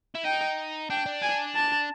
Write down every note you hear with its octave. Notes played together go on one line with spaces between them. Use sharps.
E4
D#4 G5
D4 G5
D4
G#5
A5